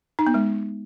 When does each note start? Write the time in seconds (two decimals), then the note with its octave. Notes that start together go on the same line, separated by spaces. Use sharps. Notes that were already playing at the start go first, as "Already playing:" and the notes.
0.19 D#4
0.27 B3
0.34 G#3